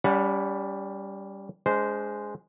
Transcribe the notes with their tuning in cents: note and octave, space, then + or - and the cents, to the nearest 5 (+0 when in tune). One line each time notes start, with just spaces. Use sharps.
G3 +5 C#4 +40 F#5 -20
G#3 +0 D4 -30 C5 -15